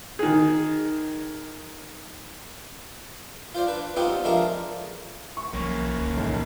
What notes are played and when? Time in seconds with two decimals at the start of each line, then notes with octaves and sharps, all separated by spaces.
0.19 D#3 G#4
3.54 F4 C5 D5
3.67 D4 B4
3.96 G3 B3 C4 D#4 F4 G4
4.24 F3 G#3 A3 D4 A#4 F5
5.37 C#6
5.53 B1 F3 F#3 A#3 C#4
5.98 F1 C#2 C#3
6.17 B1 F2 A#2 E3